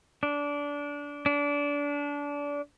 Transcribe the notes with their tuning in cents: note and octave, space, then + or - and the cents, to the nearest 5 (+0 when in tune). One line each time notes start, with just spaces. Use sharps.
D4 -20
D4 -25